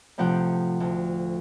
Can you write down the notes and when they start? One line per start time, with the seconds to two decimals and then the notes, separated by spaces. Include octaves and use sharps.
0.18 A2 C3 F3 F#5 G5
0.80 D2